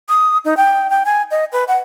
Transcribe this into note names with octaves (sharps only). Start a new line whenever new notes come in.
D#6
D#4
G5
G5
G#5
D#5
B4
F#5